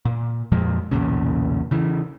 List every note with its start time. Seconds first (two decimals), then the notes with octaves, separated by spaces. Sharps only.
0.05 A#2
0.52 F2 A#2 F3 G#3
0.91 B1 E2 A#2 C#3
1.71 C#3 E3